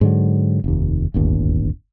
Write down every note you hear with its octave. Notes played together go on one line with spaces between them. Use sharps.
G#2 D3 F#3
F1 D#2
D1 G1 D#2